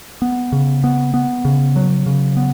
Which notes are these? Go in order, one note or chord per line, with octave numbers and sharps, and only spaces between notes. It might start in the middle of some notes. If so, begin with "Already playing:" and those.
B3
C#3
B3
B3
C#3
F#3
C#3
B3